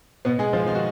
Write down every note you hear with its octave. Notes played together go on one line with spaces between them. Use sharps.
B2 B3
G#3 G#4
F3 F4
D#3 D#4
F#4